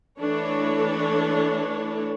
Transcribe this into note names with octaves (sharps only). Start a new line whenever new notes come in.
E3 A3 D4 A4 C#5